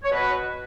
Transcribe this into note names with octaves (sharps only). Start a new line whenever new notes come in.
C#5
B2 F#4 B4